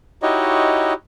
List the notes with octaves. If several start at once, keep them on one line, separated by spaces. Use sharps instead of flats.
D#4 E4 F#4 G4 C#5 D#5